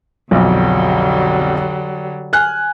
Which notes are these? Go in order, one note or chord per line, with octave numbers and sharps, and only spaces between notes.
B1 F2 D3 F#3 G3
G#5 F6 F#6